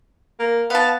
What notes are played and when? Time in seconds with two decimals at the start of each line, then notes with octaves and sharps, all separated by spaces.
0.39 A#3
0.70 B3 F5 A5